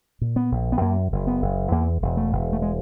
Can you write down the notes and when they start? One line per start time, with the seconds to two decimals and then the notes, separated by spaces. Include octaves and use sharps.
0.21 A#2
0.36 B3
0.52 A#1
0.72 B3
0.81 F#2 A#3
1.12 F#1
1.27 B3
1.42 F#1
1.71 E2 A#3
2.02 E1
2.17 A3
2.32 E1
2.53 A3
2.62 G#3